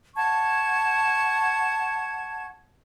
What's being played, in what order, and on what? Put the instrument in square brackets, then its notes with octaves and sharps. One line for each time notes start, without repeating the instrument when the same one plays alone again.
[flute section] F#5 A5 C#6 G#6